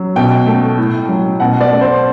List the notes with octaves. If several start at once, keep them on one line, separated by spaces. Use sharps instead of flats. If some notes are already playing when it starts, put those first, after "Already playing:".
Already playing: F#3
B2 G5
A3
A2
F#3
B2 F#5
D5
A3
C5